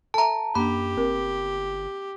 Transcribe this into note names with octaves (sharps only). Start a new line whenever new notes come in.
A4 E5 A5 A#5
F#2 A#3 D4 G4 B5
G1 C4 A#4